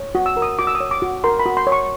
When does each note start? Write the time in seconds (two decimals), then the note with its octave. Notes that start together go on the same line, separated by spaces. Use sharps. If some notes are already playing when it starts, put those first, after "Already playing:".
Already playing: C#5
0.15 F#4
0.26 E6
0.37 A#4
0.42 D#6
0.59 F#4 D6
0.67 E6
0.75 D#6
0.80 C#5
0.91 D6
1.02 F#4
1.24 A#4 C6
1.39 B5
1.46 F#4
1.57 C6
1.67 C#5
1.72 C#6